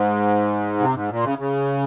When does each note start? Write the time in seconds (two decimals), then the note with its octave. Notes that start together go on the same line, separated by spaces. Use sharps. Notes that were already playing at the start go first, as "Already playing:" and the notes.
Already playing: G#2
0.80 C3
0.94 G#2
1.09 A#2
1.24 C#3
1.39 C#3